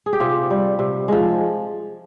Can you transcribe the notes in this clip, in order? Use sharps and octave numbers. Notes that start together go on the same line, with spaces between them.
G#4
G4
C3 F4
G3
C3
F3 G#3